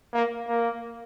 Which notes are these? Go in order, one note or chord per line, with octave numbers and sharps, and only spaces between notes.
A#3
A#3